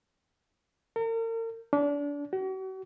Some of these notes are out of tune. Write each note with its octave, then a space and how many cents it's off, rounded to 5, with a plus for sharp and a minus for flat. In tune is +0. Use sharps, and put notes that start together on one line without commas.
A#4 -40
D4 -30
F#4 +40